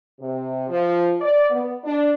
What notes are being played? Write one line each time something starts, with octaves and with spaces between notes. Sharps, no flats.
C3
F3
D5
B3
D4